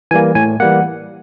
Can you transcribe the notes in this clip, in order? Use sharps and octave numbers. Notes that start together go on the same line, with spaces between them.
E3 G3 A#3 G#5
A2 G#5
E3 G3 A#3 F#5